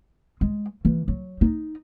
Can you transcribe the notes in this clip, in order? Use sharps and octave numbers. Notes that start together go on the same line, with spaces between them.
G#3
E3
F#3
D#4